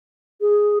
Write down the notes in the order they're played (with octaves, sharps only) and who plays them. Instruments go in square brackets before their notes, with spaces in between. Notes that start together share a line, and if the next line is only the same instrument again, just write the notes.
[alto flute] G#4